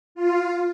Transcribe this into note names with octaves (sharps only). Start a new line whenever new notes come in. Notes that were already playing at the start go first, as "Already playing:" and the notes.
F4